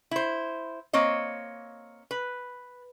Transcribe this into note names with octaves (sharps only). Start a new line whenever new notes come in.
E4 C5
A#3 C4 C#5 D#5
B4